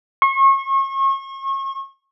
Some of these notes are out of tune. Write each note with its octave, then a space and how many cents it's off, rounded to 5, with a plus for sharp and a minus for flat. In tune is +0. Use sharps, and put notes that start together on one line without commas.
C#6 -35